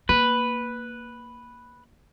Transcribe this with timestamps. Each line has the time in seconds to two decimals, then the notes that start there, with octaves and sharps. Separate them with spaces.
0.09 A#3 B4